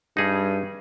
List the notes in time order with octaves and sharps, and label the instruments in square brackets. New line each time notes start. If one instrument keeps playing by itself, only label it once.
[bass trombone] G2 [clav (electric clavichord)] D#4 G#4